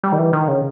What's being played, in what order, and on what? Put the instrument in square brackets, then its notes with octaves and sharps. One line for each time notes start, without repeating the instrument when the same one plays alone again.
[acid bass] G3
D#3
E3
D#3
C#3